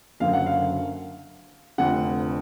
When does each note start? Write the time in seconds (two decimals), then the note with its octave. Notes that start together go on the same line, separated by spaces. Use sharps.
0.20 F#1 F#2 D3 F#3 F5
0.33 F#5
0.46 F5
1.78 F1 F2 D3 F#5